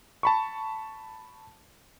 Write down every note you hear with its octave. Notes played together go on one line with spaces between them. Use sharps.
A5 B5 C#6